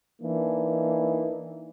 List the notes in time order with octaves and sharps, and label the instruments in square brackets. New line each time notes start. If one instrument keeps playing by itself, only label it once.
[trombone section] E3 A#3 D4 D#4